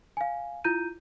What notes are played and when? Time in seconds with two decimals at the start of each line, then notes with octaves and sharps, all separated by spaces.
0.17 F5 G#5
0.64 E4 F4 A#5 G6 D#7